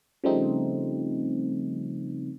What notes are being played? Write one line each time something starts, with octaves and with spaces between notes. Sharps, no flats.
C#3 F3 G3 A3 C4 D#4